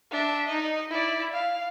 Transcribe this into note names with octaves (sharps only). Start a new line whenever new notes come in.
D4 E5
D#4 D#5
E4 D5
F5